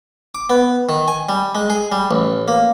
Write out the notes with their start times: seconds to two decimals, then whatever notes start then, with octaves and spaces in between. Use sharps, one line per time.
0.35 D6
0.50 B3
0.89 D#3
1.08 G#5
1.29 G3
1.55 G#3
1.70 G#4
1.92 G3
2.11 A1
2.48 A#3